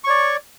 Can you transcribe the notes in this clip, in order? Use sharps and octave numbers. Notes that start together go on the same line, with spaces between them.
C#5 D5 C#6